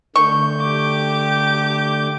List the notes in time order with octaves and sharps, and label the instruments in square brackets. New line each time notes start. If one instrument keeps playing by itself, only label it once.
[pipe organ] D3 A3 G6 [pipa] C#6
[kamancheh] G4 D6